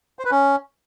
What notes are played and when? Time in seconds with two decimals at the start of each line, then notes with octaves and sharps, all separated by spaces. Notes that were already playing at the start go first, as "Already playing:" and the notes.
0.19 C5
0.25 B4
0.31 C#4